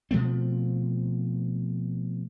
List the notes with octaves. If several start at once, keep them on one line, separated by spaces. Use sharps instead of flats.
B2 F3 A3 C4